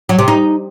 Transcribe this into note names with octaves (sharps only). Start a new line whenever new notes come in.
F#3
C3
D#4